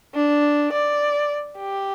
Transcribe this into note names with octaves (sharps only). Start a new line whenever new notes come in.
D4
D5
G4